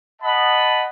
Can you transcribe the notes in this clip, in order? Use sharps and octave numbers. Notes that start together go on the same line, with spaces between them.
D#5 F#5 A5 B5